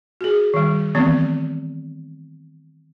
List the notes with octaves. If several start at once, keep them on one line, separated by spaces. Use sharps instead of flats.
F#4 G#4
D#3 G3
D#3 E3 A3 B3 C4